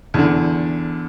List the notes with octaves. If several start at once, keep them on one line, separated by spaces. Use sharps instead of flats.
E2 D3